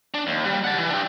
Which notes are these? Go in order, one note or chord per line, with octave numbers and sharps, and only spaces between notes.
D4
D#2
G3
F#5 A5
E3
D4 G4